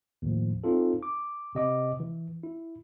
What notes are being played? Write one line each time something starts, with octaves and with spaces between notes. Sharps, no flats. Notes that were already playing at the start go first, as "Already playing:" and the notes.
D#2 A2 F3
C4 D#4 F4 A4
D6
C3 D#5 D6
E3
E4